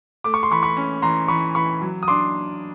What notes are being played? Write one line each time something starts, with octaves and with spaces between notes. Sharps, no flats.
A3 D6
C#6
C6
E3 B5 C#6
B5 C#6
C#4
E3 A#5 C6
E3 B5 C#6
E3 B5 C#6
F#3
D#6
D4 C6 D6